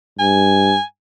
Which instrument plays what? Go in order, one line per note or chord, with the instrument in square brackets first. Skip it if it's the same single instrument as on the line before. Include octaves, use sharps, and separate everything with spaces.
[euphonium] G2 [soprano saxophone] G#5